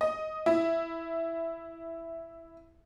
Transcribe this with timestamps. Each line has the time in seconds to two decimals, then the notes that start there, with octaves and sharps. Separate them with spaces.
0.01 D#5
0.46 E4